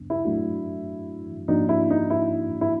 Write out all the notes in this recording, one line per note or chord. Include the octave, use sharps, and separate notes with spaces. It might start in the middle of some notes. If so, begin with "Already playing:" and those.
Already playing: D#2 C#3 F#3 B3 D4
E4
A#2 F#3 A3 D4 F#4
G#2 F3 A#3 D4 D#4 F#4
E4
D#4
E4
E4